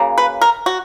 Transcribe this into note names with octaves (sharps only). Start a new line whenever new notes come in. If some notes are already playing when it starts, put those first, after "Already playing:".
Already playing: C#3 F#3 A#3
B4
A#4
F#4